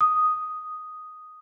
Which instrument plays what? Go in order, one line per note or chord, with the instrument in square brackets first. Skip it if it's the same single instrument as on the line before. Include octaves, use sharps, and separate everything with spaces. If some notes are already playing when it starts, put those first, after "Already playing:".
[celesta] D#6